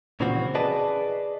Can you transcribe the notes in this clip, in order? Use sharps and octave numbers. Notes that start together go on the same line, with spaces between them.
A#2 C#3 E3 F3 C4 F#4
G#4 B4 D5 D#5 A5